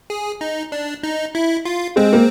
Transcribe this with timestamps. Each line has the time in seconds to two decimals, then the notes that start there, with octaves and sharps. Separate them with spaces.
0.10 G#4
0.41 D#4
0.72 D4
1.03 D#4
1.35 E4
1.65 F4
1.96 G#3 C4
2.13 A#3